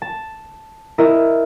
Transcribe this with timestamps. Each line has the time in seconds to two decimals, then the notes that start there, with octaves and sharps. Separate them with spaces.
0.02 A5
0.98 E4 A#4 D#5 E5